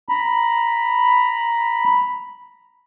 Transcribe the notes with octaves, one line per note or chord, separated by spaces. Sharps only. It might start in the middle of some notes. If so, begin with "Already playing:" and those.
A#5 B5